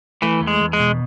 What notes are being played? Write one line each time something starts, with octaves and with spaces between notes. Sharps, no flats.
E3 A3
E2
G#3
E2
G#3
B2